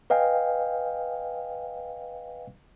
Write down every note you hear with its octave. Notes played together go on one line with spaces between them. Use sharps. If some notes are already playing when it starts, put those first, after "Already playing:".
B4 D#5 F5 G5 G#5